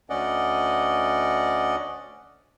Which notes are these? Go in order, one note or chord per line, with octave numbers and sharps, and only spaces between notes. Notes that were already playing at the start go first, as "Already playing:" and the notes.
D2 C#4 D5 D#5 F#5